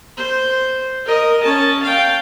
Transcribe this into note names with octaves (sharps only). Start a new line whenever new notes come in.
C5
A#4 D#5
C#4 A5
F5 G5